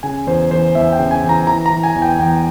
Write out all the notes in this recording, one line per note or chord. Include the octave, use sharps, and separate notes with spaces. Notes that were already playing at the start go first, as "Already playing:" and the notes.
C#3 G#5
E2 C5
E3 C5
E2 E5
G5
C#3
G#5
E2
A#5
E3 A#5
A#5
E3
G#5
E2
G5
E2 G5